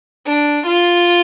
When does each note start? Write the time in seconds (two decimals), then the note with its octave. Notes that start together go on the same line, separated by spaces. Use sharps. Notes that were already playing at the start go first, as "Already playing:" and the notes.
0.26 D4
0.67 F4